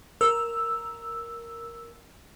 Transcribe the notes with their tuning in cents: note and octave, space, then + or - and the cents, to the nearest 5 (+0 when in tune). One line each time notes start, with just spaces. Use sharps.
A#4 +0 E6 +0